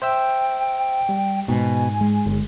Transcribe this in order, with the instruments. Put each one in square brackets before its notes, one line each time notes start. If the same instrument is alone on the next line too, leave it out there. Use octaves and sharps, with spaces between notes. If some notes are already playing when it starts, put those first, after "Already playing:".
[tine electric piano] C5 E5 E6 [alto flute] G5
[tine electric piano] G3
[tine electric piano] G#2 [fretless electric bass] B2 [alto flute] G#5
[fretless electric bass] G#3
[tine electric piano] G1